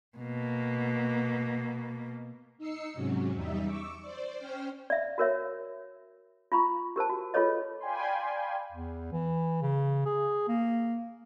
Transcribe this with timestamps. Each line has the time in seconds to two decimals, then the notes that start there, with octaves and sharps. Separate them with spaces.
0.18 B2 A#3
2.58 D#4 E6 C7 C#7
2.93 G#2 C3 F#3 C#4
3.33 E2 G3 D#4 E5
3.65 C#6 D6 E6
4.01 C5 D5
4.38 C#4 C5 G5 F6
4.90 D5 E5
5.18 F#4 A#4 C#5 E5
6.52 F4 A#5 B5 C#6
6.96 G4 A#4 C5 A5
7.10 F#4
7.34 F4 G#4 A4 B4 C#5 D#5
7.80 D5 F5 G5 G#5 B5 C6
8.72 E2
9.12 E3
9.62 C#3
10.06 G#4
10.48 A#3